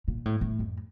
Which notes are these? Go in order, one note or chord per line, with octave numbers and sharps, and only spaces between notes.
A#2
A2
A2
F2